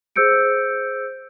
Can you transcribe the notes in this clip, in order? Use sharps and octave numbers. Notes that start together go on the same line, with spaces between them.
G#4 C5 E6 G6 C#7 D7